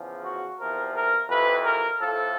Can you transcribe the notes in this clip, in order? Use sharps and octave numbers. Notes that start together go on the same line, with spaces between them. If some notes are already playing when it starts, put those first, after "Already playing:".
Already playing: E2 C#3 F3
F#4
E2 C3 F3 A#4
A#4
F2 C3 E3 B4
A#4
A2 F3 A4